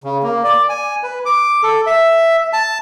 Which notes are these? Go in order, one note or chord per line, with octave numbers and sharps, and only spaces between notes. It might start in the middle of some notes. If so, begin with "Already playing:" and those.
C#3
A#3
D5
G#5
B4
D6
A4
E5
A5